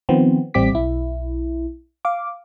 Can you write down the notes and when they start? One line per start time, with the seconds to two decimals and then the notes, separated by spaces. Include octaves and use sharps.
0.09 D#3 F3 B3 C4
0.54 A1 G3 C4 G4 D6 B6
0.72 B1 E4
2.05 F5 D6